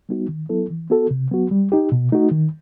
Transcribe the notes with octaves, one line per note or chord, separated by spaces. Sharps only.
G3 B3 D#4 F#4
D#3
F#3 B3 E4 A4
E3
B3 F#4 A4
C3
F#3 B3 F#4
G3
D#4 G4
B2
A3 D#4 F#4
D#3